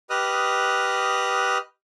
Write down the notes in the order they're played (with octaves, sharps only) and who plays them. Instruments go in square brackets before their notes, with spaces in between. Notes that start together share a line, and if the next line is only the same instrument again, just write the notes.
[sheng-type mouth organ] G4 B4 D#5 D#6 F6 F#6